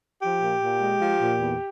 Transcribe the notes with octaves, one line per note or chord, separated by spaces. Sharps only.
F3 G4
A#2
A#2
G#3
F3
A#2
E2